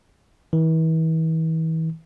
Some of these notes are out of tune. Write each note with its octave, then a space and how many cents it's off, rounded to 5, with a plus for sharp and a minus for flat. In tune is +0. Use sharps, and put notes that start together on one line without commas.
E3 -40